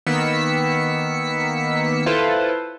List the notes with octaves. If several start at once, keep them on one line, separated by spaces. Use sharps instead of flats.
D#3 A#3 B3 E6 B6 C#7
E4 F4 A4 B4 C5